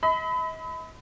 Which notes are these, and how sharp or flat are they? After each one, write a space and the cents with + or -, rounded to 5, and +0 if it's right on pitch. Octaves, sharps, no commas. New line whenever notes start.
D#5 +45 B5 +30